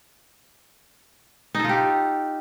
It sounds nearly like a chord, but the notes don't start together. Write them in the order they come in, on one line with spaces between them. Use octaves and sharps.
D#4 A4 F4 G4